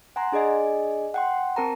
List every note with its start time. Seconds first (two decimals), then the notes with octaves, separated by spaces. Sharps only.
0.16 F#5 G#5 A#5 C6
0.32 D4 G#4 D5 D#5 G#5
1.14 F#5 G5 C6
1.56 C4 A#4 A5 A#5